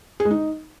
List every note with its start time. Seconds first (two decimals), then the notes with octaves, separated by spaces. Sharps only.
0.20 G#4
0.25 G#3
0.31 D#4